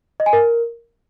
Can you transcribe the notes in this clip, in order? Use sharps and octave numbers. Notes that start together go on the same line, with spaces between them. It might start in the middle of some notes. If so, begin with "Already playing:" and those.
D#5
G#5
A#4